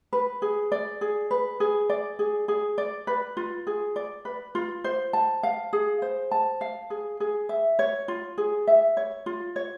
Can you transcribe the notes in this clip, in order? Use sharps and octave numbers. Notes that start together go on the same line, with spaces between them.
B4
G#4
D5
G#4
B4
G#4
D5
G#4
G#4
D5
B4
F4
G#4
D5
B4
F4
C5
A5
F5
G#4
C5
A5
F5
G#4
G#4
E5
C#5
F4
G#4
E5
C#5
F4
C#5